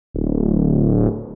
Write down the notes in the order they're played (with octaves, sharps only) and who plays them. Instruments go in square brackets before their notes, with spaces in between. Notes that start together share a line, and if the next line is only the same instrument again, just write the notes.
[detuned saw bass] D1